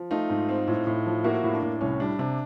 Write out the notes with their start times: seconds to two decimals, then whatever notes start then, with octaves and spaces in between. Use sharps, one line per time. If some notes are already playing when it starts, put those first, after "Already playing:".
Already playing: F3
0.11 A3 D#4 F4
0.30 G#2
0.49 C4
0.68 A2
0.87 A2
1.06 F3
1.24 A#3 E4 F#4
1.44 A2
1.53 D4
1.62 A2
1.81 C2 C#4
2.00 G3 D4
2.19 C3 D4